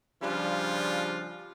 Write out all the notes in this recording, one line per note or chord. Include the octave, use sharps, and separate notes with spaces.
C#3 F3 G3 D4 F4